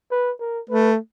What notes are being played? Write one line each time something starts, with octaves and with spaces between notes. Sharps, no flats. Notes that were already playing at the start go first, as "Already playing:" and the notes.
B4
A#4
A3 B4